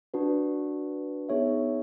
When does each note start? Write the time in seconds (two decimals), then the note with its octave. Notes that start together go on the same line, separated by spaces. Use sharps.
0.14 D4 F#4 B4
1.29 B3 D#4 G#4 C#5 E5